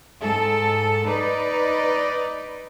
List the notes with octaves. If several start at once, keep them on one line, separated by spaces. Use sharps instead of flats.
G#2 A4
D#4 B4 D5